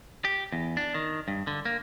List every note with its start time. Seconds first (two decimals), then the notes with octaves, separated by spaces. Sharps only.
0.25 G4
0.52 E2
0.77 D4
0.94 D#3
1.28 G2
1.47 D3
1.65 A#3